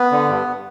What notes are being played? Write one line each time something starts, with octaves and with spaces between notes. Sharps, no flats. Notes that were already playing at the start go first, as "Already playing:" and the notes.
Already playing: B3
D3
G2